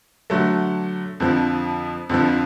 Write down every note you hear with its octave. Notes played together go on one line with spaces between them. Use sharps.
D3 F#3 A3
F2 D3 F3
F2 D3 F3